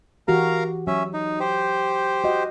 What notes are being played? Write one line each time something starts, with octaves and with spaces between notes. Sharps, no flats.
E3 F#4 G4 A#4 F5 A#5
F#3 C#4 E5
D#4
G4 C5
F#4 D#5 F#5